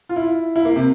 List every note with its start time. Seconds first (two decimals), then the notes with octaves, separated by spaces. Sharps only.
0.09 F4
0.16 E4
0.56 E4
0.65 A#3
0.76 C3